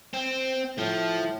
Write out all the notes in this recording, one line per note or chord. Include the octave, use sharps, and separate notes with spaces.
C4
A2 F3